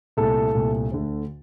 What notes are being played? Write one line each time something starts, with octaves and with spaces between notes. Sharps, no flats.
C2 A#2 A3 A4
C2 A#2 A3
D2 D3 A3